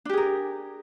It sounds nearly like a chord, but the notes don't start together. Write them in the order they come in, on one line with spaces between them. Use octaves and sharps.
D4 G4 G#4 A#4